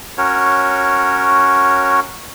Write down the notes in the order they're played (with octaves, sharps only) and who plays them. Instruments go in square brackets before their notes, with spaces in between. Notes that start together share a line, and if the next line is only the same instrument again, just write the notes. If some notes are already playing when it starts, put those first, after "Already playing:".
[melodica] C#4 F#4 A#4 C#5